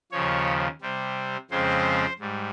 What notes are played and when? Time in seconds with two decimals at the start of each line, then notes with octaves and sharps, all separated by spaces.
0.12 D#2 C#3 F3 C#5
0.82 C3 G3 C4
1.50 F2 C#3 F3 G#3 C4 C5
2.19 G#2 G3